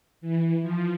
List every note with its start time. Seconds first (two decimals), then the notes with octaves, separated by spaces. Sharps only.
0.21 E3
0.62 F3